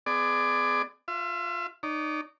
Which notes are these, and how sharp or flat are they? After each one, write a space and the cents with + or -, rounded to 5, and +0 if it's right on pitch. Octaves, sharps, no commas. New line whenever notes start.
B3 +40 G#4 +10 D5 +15
F4 +10 E5 +40
D#4 -25 D5 -40